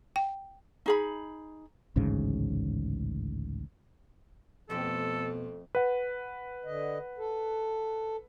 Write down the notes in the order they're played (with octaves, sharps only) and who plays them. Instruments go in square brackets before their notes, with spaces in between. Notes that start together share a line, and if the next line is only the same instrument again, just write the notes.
[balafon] G5
[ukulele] D#4 G#4 B5
[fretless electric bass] A1 D2 G#2 C#3
[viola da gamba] F2 [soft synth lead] B2 [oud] A3 C#4 G4 [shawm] A4
[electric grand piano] B4 F#5
[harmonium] D3 D#5
A4